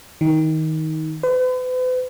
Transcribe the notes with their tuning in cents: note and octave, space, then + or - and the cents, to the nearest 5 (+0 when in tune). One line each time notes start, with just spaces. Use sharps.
D#3 +20
B4 +45